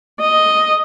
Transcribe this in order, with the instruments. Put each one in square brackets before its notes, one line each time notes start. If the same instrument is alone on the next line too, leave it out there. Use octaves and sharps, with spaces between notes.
[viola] D#5